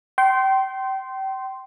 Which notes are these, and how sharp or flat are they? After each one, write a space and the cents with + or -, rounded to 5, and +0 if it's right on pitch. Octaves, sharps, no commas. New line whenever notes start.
G5 -30 C6 +0